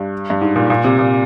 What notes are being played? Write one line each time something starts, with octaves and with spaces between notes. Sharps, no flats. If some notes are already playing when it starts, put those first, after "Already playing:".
Already playing: G2
G2
G#2
A#2
A#2
C3
A#2